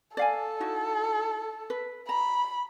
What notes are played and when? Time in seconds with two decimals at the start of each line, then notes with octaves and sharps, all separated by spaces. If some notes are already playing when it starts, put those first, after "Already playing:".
0.17 A4 D5 F5 G#5
0.60 D#4 E4 F#4
1.70 B4
2.09 A#5 B5